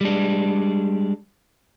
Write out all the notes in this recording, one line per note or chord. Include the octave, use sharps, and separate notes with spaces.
G3 G#3 D4